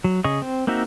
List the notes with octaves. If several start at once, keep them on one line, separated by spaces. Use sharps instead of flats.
F#3
C#3 G#4 D#5 C#6
C4
A#3 C4 D#4 F#4 E5